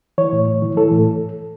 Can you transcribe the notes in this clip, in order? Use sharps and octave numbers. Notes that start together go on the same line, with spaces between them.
E3 C#5
A2
A2
E3
E3 A4
A2